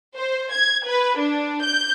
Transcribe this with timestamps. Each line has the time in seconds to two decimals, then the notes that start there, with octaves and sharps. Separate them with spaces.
0.16 C5
0.53 G#6
0.87 B4
1.18 D4
1.64 G6